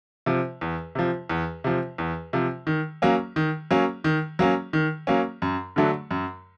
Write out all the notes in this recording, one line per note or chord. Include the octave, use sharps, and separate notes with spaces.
C3 F3
E2
C3 F3
E2
C3 F3
E2
C3 F3
D#3
F#3 A#3 C#4
D#3
F#3 A#3 C#4
D#3
F#3 A#3 C#4
D#3
F#3 A#3 C#4
F#2
D3 F#3 A3 D4
F#2